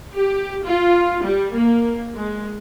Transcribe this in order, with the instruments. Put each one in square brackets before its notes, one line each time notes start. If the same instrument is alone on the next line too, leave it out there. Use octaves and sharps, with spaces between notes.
[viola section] G4
F4
G3
A#3
G#3